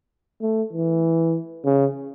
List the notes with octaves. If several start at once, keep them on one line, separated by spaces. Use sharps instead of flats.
A3
E3
C#3